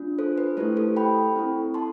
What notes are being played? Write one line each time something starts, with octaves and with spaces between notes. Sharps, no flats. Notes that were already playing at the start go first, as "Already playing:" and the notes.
Already playing: D4 F4
A4 C5
B4
A3 E4 G4 A4 C5
A4 C5
G5 B5
C4 E4 A4
A5 C6